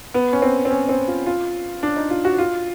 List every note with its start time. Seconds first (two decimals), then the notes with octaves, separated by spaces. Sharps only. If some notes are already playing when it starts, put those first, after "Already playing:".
0.14 B3
0.33 C#4
0.42 C4
0.65 C4
0.71 C#4
0.89 C4
1.08 F4
1.26 F4
1.83 D4
1.96 D#4
2.10 F4
2.25 F#4
2.38 F4